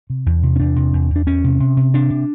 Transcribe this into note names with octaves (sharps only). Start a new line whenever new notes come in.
C3
E2
C3
C#4
E2 D4
C3
E2
E2
D4
E2 C#4
C3
C3
C3
C3 D4
C3